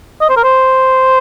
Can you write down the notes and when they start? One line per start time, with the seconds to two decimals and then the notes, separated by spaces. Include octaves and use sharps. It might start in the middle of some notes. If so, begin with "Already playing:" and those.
0.21 D#5
0.29 C5
0.37 A#4
0.44 C5